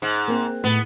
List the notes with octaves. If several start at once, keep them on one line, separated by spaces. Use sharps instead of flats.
G#2
A#3 C4
A2 B3